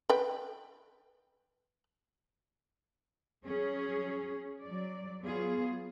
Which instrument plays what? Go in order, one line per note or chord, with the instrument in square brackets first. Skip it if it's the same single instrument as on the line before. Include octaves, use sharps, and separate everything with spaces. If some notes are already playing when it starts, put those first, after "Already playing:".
[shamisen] B4 G5
[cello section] F#3 C#4 G#4
F#3 D5
F#3 B3 F4 G#4